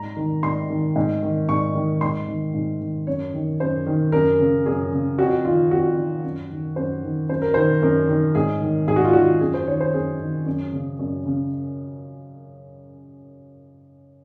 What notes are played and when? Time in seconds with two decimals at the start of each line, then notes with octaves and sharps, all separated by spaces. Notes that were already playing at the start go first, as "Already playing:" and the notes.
Already playing: G#2 A#5
0.17 D#3
0.43 G#2 C6
0.70 D#3
0.96 G#2
1.23 D#3
1.49 G#2 C#6
1.75 D#3
2.01 G#2 C6
2.28 D#3
2.54 G#2
2.80 D#3
3.07 F#2 C#5
3.34 D#3
3.60 F#2 C5
3.86 D#3
4.12 F#2 A#4
4.39 C#3
4.66 F#2 G#4
4.92 C#3
5.18 F2 F#4
5.45 D#3 F4
5.71 F2 F#4
5.98 D#3
6.24 F#2
6.51 D#3
6.76 F#2 C5
7.03 D#3
7.29 F#2 C5
7.42 A#4
7.54 D#3 C5
7.82 F#2 A#4
8.09 D#3
8.35 G#2 G#4
8.62 D#3
8.88 G#2 G#4
8.96 F#4
9.05 F4
9.13 D#3 F#4
9.40 F#2 G#4
9.54 C5
9.67 D#3 C#5
9.81 C5
9.93 F#2 G#4
10.20 D#3
10.46 F#2
10.73 C#3
10.99 F#2
11.25 C#3